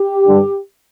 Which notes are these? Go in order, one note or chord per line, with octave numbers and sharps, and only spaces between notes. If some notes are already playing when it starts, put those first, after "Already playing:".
Already playing: G4
G2 D3